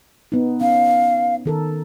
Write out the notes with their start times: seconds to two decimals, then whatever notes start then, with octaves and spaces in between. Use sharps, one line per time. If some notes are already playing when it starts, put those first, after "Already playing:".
0.32 B3 D#4
0.61 C#4 F5
1.45 D#3 A4 A#4